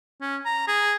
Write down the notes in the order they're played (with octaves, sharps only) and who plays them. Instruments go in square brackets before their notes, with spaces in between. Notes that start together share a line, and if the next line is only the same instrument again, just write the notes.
[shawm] C#4
A#5
G#4